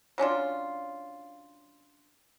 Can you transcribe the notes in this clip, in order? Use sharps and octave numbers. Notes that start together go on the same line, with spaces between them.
F#3 C#4 D4 F4